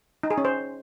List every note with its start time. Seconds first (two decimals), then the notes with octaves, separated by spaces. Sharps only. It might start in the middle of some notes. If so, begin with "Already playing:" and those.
0.23 D#4
0.31 G#4
0.38 C#4
0.45 C5